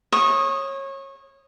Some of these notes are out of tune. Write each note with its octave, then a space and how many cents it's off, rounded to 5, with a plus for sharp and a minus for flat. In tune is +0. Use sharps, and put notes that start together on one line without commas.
C#5 -25 D#6 +0